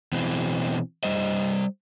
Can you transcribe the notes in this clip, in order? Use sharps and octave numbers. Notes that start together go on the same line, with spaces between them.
B2 E3 C4
G3 C5 D#5